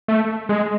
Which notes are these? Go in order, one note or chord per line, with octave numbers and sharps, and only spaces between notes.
A3
G#3